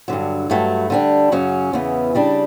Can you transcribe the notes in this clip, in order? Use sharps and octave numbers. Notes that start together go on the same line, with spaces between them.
G2 D3 F#3
G2 F#3 A3
D3 G3 D4
F#2 C#3 F#3 C#4
E2 C#3 E3 B3
C#3 G3 D4